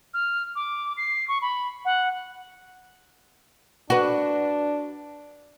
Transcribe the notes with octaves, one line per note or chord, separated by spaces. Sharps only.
F6
D6
C7
C#6
B5
F#5
D4 F#4 B4